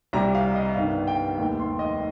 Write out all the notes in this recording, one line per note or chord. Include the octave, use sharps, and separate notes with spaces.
C2 C3 G3 A#5
F5
D#5
G1 G2 D#3 F5
G5
F1 D#2 D#3 G5
C6
D#5